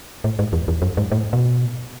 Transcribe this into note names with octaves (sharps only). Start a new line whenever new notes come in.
A2
G#2
E2
E2
F#2
G#2
A2
B2